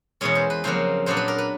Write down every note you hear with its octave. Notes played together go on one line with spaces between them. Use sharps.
E2 B2 G#3 C#4 C#5
C5
B4
F2 C#3 F#3 A#3 C5
A#2 F#3 B3 D4 C5
B4
A#4
B4